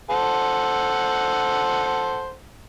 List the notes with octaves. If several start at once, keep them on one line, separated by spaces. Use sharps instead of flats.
A4 C5 F#5